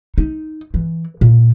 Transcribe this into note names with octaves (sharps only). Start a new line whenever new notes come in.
D#4
E3
A#2